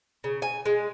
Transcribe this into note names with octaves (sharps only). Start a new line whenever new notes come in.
C#3
G#5
G#3